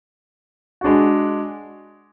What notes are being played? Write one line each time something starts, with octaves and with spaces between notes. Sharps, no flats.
G#3 D4 F#4